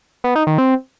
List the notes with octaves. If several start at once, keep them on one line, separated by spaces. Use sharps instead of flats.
B3
D#4
D#3
C4